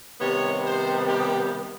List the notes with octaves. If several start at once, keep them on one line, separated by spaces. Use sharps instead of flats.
C3 D#3 G3 B3 C#5
C5
G4